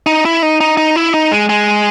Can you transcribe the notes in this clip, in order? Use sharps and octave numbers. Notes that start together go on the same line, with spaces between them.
D#4
E4
D#4
D#4
D#4
E4
D#4
G#3
G#3